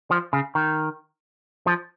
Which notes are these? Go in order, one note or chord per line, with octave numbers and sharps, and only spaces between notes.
F3
C#3
D#3
F3